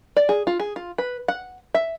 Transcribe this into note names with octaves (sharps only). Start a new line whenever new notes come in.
D5
G#4
F4
G#4
F4
B4
F#5
E5